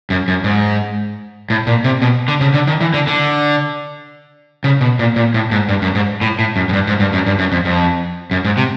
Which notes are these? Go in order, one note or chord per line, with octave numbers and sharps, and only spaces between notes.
F#2
F#2
G#2
A2
A#2
C3
B2
D3
C#3
D3
D#3
E3
D3
D3
C#3
B2
A#2
A#2
A2
G#2
G2
F#2
G#2
A2
A2
F#2
F#2
G2
G#2
G2
F#2
G2
F#2
F2
F2
F#2
G#2
C3